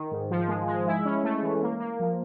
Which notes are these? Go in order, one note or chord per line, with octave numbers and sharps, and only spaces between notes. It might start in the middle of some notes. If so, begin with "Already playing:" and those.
Already playing: D#3
G#2
F3
G#3
G#3
E4
C#4
A3
E3
A#3
A#3
F3